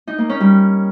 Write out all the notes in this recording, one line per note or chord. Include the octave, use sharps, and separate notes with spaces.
D#4
A#3
C#4
G3